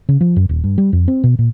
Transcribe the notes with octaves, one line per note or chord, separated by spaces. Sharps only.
C#3
F3
F#2
D#1
G2
G3
F2
C4
B2
A#2